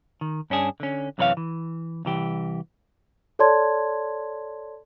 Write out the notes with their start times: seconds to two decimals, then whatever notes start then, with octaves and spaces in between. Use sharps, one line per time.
0.21 D#3
0.50 G2 C#4 D4 G#4
0.80 D3 C#4
1.18 F#2 C3 E3 B4 C#5 F5
1.37 E3
2.05 C2 E3 G4
3.39 A4 C#5 D5 A5 C6 G#6